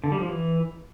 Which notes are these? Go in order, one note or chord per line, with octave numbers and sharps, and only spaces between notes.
D3
G3
F3
E3